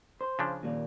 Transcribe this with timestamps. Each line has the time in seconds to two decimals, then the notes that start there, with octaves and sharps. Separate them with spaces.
0.21 C5
0.39 C#3 F3 D4
0.63 D#2 A#2